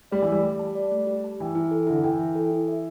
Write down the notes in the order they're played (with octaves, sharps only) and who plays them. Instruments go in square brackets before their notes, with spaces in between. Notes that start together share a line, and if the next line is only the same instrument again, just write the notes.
[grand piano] G3 [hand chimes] D5
[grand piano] E3
[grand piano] G3 [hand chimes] A3
[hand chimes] G4
A5
D5
A3
G4
A5
[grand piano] E3 [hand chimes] G5
[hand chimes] E4
A4
[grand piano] D3 [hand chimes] E4
[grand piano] E3 [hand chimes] G5
[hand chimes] E4
A4
E4
E5